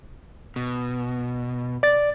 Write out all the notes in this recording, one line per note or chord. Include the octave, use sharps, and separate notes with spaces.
B2
D5 A6